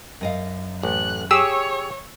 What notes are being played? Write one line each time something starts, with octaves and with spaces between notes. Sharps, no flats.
F#2 D#5 F5
A1 F#6
G4 G#4 C#5 E6